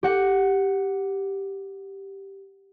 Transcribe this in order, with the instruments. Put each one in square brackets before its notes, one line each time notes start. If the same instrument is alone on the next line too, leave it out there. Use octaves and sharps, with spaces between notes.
[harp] G4 F#5